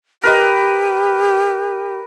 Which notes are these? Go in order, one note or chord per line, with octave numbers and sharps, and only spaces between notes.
G4 A#4 B4 D#5